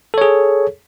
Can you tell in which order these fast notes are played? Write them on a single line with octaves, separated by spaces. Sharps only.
A4 C#5 G#4